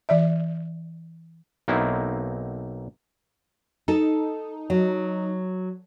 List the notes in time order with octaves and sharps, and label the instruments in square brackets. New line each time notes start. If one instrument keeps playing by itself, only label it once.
[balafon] E3 D5 E5
[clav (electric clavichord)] B1 A#3 C4 D#4 E4 F#4
[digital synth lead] D#4 [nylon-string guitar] A4
[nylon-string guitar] F#3